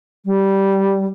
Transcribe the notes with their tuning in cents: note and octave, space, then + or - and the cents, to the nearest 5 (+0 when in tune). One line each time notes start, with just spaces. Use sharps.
G3 -10